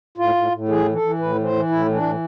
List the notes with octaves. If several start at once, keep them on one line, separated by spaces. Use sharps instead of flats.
A2 F4
A2
A2
E3 G#4
E3
A4
E3
A2 B4
E3
C5
E3
A2 E4
E3
D4
A2